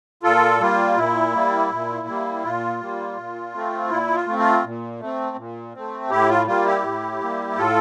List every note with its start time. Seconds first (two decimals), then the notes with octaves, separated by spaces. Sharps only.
0.23 A#2 F4 A4
0.60 G3 A#3 F4
0.96 A#2 E4
1.33 G3 A#3
1.71 A#2
2.07 G3 A#3
2.44 A#2 F4
2.81 G3 A#3
3.17 A#2
3.54 A3 C4
3.90 A#2 E4
4.15 F4
4.26 A3 C4
4.39 F4
4.64 A#2
5.00 A3 C4
5.37 A#2
5.74 A3 C4
6.10 A2 E4 G4
6.29 F4
6.47 G3 A#3 F4
6.65 E4 G4
6.83 A2
7.20 G3 A#3
7.57 A2 F4 A4